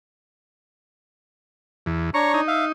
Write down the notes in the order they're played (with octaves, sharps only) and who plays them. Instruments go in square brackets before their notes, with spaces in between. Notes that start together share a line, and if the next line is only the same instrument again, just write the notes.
[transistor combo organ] E2
[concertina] D4 C#5 A#5 [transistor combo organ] C#6
[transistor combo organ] D#4
[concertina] E5 F5